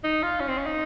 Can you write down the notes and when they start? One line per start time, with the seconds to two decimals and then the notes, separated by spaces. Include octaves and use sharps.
0.04 D#4
0.23 F4
0.40 C#4
0.48 C4
0.57 C#4
0.66 D#4